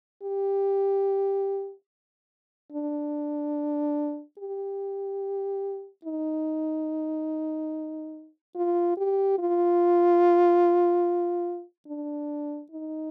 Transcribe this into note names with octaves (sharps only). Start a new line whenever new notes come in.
G4
D4
G4
D#4
F4
G4
F4
D4
D#4